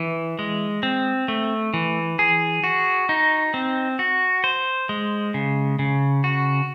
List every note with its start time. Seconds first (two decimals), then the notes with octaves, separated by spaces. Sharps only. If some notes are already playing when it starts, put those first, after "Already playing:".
Already playing: E3
0.39 G#3
0.83 C4
1.28 A3
1.74 E3
2.19 G#4
2.64 F#4
3.09 D#4
3.54 C4
3.99 F#4
4.44 C5
4.89 G#3
5.34 C#3
5.79 C#3
6.24 F#4